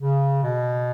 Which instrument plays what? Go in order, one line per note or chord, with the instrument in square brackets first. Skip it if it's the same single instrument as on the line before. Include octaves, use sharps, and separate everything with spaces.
[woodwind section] C#3
B2